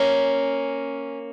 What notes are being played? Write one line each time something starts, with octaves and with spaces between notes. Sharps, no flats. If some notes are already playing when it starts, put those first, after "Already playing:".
Already playing: A#3 C#4